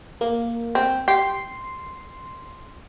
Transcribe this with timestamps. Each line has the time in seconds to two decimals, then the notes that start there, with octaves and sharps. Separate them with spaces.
0.21 A#3
0.75 C4
1.08 G4 C6